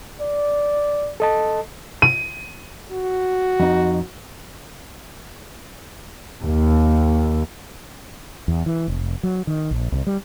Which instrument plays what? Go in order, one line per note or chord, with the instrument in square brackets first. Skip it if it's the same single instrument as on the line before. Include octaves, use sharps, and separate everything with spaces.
[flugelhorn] D5
[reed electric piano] A4 D#5 A5
[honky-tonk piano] D#7
[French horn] F#4
[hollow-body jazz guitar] F2 D#4
[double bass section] D#2
[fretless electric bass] E2
E3
F1
F#3
D#3
A#1
C2
G3